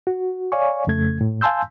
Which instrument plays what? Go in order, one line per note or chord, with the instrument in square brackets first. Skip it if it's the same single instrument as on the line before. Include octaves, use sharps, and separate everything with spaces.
[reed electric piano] F#4
C#5 D5 F5 G#5 C#6
F2 C#3 A3 G#6
A2
F5 G#5 A5 C6 E6 G6